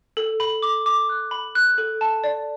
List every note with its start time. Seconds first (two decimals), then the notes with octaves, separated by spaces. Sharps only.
0.17 A4
0.40 B5
0.63 D6
0.86 D6
1.09 F#6
1.31 B5
1.55 F#6
1.78 A4
2.01 A5
2.24 D5